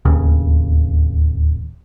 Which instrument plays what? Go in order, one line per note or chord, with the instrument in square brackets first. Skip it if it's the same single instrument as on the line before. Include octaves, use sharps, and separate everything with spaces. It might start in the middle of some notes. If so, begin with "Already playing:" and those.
[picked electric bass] D1 D#2 C#3